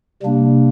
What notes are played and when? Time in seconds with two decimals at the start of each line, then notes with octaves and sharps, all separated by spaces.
0.23 C3 G3 A#3 D4